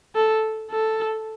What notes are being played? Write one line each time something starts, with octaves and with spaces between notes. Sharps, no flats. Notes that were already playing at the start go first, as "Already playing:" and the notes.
A4
A4